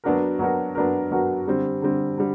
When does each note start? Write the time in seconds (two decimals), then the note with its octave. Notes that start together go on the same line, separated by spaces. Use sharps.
0.04 F#3 B3 D4 F#4 A#4
0.39 F#3 B3 D4 F#4 A#4
0.75 F#3 B3 D4 F#4 A#4
1.11 F#3 B3 D4 F#4 A#4
1.47 D3 G3 C4
1.82 D3 G3 C4
2.18 D3 G3